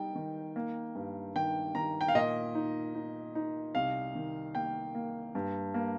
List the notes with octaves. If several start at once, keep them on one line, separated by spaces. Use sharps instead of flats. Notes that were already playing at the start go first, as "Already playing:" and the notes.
Already playing: G3 D#4 G5
D#3
A#3
G2
D#3 G5
D#3 A#5
G5
F5
A#2 D#5
D#4
D#4
D#4
C2 F5
D#3
A#3 G5
A#3
G2
A#3